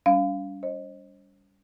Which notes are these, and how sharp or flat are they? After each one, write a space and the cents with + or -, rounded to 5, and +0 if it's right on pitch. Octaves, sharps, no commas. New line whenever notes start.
G3 +0 C#4 +45 F5 -5
C5 +35 D#5 +0